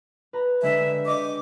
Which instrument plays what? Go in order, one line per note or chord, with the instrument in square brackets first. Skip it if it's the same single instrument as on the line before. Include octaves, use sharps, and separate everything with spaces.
[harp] B4 A#5
[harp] D3 G#3 G4 [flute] E5
[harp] D#5 C#6 [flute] D6